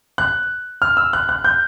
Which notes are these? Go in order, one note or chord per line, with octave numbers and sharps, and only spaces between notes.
F#6
F6
E6
F#6
F#6
G6